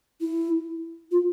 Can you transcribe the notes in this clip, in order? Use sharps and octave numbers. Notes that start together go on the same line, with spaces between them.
E4
F4